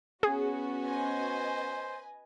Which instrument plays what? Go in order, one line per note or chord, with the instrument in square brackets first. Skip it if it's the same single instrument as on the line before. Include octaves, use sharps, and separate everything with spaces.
[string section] B3 C#4 F#4 [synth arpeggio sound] G#4
[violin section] B4 D#5 G#5 [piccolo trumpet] C5